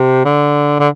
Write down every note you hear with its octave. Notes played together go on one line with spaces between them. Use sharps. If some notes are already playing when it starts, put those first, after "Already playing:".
Already playing: C3
D3
D3